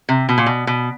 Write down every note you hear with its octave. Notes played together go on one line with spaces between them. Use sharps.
C3
B2
A#2
B2
B2